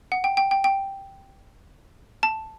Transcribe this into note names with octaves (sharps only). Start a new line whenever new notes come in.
F#5
G5
G5
G5
G5
A5